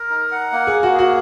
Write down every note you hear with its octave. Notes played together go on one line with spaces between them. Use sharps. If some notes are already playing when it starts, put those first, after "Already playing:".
Already playing: A#4
D#4
F#5
A#3
G#4
A#3
F#4
G#4
F#4